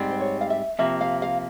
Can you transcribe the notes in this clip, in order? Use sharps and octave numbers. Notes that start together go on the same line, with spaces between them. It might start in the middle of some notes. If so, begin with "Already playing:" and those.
Already playing: G#2 G3 C4
C5
C#5
F5
E5
C3 F3 A#3 E5
F5
F5